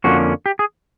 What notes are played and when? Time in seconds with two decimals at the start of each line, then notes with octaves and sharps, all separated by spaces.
0.04 F2 D3 F3 A#3 C#4 F#4
0.46 G4
0.59 G#4